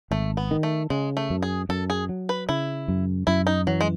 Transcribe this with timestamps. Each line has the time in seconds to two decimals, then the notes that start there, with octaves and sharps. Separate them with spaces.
0.11 G#1 A3
0.37 B3
0.51 D#3
0.63 A3
0.90 C#3 G#3
1.17 A3
1.30 F#2
1.42 G#4
1.69 F#2 A4
1.90 G#4
2.09 F#3
2.29 B4
2.49 C#3 E4
2.88 F#2
3.27 F#2 E4
3.47 D#4
3.67 E3 F#3
3.81 G#3